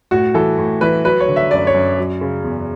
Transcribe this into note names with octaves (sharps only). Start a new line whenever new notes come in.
A2 F#4
E3 A4
A2
E3 B4
F#3 B4
C#5
D3
E5
F#2 D5
C#5
F#2
F#3
C#3
E2